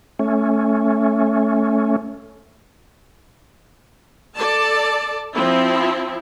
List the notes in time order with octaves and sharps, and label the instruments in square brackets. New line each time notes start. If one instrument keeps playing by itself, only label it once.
[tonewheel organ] A3 C#4
[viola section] A4 D5 A5
F3 C4 E4